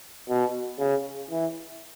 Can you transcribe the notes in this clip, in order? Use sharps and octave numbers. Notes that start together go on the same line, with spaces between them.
B2
C#3
E3